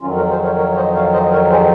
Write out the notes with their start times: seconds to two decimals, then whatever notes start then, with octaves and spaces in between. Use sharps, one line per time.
0.01 F2 D#3 F#3 C#4 F4
0.16 F#4 A#4
0.30 G#4 C5
0.43 A#4 C#5
0.57 A#4 C#5
0.72 C#5
0.76 C5 D#5
0.95 C#5 F5
1.13 C5 D#5
1.31 A#4 C#5
1.50 G#4 C5